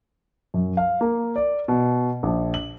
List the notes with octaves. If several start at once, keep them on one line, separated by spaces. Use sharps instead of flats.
F#2
F5
A#3
D5
B2
A#1
F#7